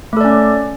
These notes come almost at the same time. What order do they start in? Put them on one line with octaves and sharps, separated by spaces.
A3 A4 D5 C#4